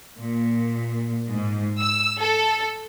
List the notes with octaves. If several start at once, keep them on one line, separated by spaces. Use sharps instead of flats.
A#2
G#2
E6
A4